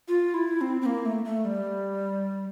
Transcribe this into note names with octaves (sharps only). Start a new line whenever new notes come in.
F4
E4
C4
C4
A#3
A3
A3
G3